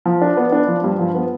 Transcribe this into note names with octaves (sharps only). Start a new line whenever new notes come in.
F3
D4
B3
D4
F3
G2
F3
B3